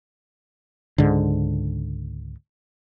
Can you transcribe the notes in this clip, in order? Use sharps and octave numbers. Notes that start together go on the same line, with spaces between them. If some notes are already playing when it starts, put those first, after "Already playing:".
C#2 G#2 D3